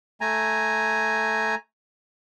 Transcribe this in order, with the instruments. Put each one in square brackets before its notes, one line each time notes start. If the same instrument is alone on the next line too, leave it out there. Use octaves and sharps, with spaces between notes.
[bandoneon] A3 G#5 A#5